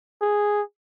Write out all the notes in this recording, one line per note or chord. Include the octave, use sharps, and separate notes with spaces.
G#4